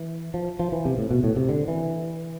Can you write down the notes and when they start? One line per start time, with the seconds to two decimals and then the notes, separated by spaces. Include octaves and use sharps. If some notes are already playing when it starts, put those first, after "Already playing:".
Already playing: E3
0.34 F3
0.59 F3
0.72 E3
0.85 C3
0.98 A2
1.11 B2
1.24 A2
1.36 C3
1.49 D3
1.68 E3